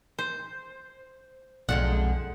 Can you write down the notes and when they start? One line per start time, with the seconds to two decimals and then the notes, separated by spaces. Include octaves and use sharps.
0.19 C5
1.69 B1 F2 D3 G#3 F#5